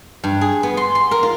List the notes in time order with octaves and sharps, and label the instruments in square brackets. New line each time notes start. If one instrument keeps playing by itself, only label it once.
[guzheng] G2
G#4
B3
C6
C6
A#4
F4